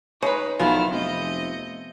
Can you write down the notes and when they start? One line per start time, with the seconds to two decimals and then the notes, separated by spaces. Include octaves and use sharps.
0.22 C#4 D#4 B4 C5
0.59 B1 D#3 F3 B3 E4 G#5 F6
0.92 F1 C3 D#5 G6